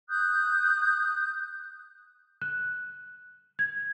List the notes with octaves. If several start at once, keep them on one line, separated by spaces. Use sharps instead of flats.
D#6 F#6 G6
F#6
G#6